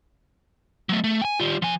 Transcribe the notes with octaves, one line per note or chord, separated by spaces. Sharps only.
F#3 A3
A3
G5 G#5
G3 F4
F3 G#5